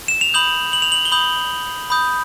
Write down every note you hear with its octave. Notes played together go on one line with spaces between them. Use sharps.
E7
F7
B5 D#6 G6 F#7
F#7
F7
F#7
G7
B5 D#6 G6 F#7
B5 D#6 G6